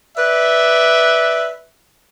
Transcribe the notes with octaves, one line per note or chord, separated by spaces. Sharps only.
B4 D5 E5